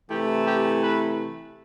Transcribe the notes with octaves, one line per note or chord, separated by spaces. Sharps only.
C3 E3 A3 E4 G4
G4
B4